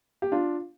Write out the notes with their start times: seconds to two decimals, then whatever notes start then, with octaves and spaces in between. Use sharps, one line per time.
0.22 G4
0.32 D4 F4